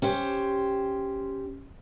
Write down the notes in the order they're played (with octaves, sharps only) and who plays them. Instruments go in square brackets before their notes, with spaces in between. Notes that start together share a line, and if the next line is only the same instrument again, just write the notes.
[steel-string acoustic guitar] C#4 G4 C5